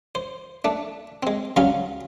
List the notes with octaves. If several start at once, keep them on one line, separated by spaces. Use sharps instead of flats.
C5
A3 D4
G#3 C4
C#2 G2 F#3 C#4 F5